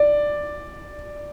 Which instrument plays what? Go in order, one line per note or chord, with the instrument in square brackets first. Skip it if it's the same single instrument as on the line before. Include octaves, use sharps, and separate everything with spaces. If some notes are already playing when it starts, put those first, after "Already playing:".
Already playing: [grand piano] D5